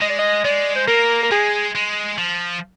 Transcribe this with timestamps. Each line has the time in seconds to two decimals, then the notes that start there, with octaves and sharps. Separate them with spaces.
0.01 G#3 D#5
0.10 D5
0.19 D#5
0.45 G#3 D5
0.76 C5
0.87 A#3 A#4
1.23 A#4
1.31 G#3 G#4
1.75 G#3
2.18 F3